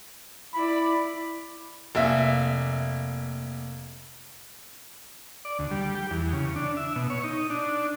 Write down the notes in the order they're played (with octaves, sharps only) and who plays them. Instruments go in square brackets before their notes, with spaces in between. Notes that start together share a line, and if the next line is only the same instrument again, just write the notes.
[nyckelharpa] E4 D5 [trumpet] B5
[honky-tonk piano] F1 A#3 E5
[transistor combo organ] D5
D2
G3
G4
E2
C#3
D4
E5
B2
C#5
D#4
D4